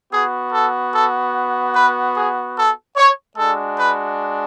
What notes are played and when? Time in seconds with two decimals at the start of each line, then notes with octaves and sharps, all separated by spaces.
0.12 B3 F#4 G#4
0.53 A4
0.93 A4
1.75 B4
2.15 G#4
2.55 A4
2.97 C#5
3.37 G#3 D4 F#4 A4
3.78 B4